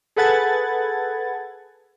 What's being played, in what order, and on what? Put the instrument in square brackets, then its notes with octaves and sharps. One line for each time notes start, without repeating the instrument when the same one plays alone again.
[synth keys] G#4 A4 B4 F#5 G#6 A6